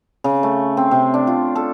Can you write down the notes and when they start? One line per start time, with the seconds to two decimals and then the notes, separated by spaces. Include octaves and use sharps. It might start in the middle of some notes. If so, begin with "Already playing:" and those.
0.24 C#3
0.43 A3
0.77 C4
0.91 C3
1.14 D4
1.27 F4
1.56 A4